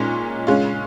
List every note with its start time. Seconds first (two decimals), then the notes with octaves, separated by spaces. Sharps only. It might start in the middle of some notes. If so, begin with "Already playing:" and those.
Already playing: A#2 G#3 C#4 D#4
0.47 C#3 G#3 C#4 F4